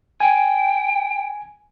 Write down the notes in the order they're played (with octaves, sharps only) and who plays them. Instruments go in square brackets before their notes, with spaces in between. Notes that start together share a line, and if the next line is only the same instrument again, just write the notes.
[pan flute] G5 [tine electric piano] G#5